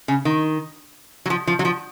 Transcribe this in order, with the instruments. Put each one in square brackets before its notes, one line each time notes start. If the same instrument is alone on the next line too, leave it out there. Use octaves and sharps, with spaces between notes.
[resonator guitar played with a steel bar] C#3
D#3
F#3
F3
F3
F#3
F3